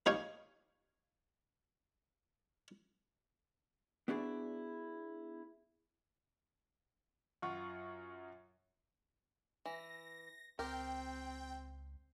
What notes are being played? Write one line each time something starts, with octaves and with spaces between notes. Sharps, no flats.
A#3 D#4 G4 C#5 F5 G#5
B3 D4 E4 F#4 G#4 D5
F#2 F4 F#5 C#6
E3 A#6
C#2 C4 G4 A#4 G5